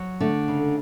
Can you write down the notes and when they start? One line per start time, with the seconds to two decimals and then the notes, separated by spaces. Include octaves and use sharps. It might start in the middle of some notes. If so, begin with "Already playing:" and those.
Already playing: F#3
0.20 D3 A3 D4
0.48 C#3